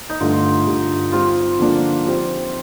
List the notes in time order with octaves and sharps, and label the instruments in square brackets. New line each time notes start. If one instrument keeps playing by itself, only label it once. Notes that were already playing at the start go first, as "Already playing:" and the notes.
[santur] D#4
[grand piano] G2 D3 A3 [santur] F4
[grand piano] G2 D3 G3
[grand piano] G3 C4 G4 [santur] F4
[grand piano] D3 F3 A#3 D4
F3 C4 G4 C5